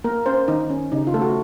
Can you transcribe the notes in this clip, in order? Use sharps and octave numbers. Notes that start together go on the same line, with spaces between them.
A#3 A#4
C#4 C5
D#3 D#4
C#4
C#3 D#4
F4
A3 A4
F#4